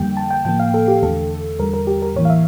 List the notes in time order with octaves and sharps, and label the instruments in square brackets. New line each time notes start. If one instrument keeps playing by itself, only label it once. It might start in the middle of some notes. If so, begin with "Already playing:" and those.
Already playing: [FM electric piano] F2 D3 G3 A#3 G5
A5
G5
A2 F3 A#3 G5
F5
A4
G4
E2 D3 A3 A4
E2 D3 G3 A#4
A#4
G4
A#4
A2 E3 A#3 C#5
F5
E5